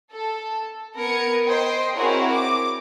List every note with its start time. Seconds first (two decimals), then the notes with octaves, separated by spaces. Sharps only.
0.11 A4
0.97 B3 A#4 G#6 C#7
1.47 C5 D#5 G5
1.95 C4 E4 F#4 G#4 A#4 C#5
2.31 D6